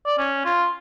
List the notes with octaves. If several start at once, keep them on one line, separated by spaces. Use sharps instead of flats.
D5
C#4
F4